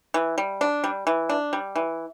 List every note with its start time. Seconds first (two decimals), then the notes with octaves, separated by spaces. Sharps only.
0.14 E3
0.38 G3
0.61 D4
0.84 G3
1.07 E3
1.30 D4
1.53 G3
1.76 E3